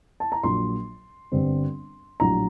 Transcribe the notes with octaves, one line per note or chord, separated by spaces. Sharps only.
A5
A#5
A#1 A#2 F#3 C6
G1 G2 D3 G3 C4
A#1 A2 F#3 A#5